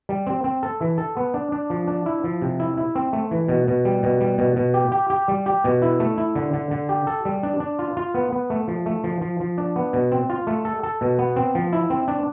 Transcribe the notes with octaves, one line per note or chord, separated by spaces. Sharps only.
G3
C4
C4
A4
E3
A4
B3
D4
D4
F3
D4
E4
F3
C3
E4
E4
C4
A3
E3
B2
B2
G3
B2
G3
B2
B2
G4
G4
G4
G3
G4
B2
E4
A3
E4
D3
D3
D3
G4
A4
G3
D4
D4
F4
F4
B3
B3
A3
F3
A3
F3
F3
F3
D4
B3
B2
C4
F4
A3
A4
A4
B2
B3
C4
F3
E4
C4
D4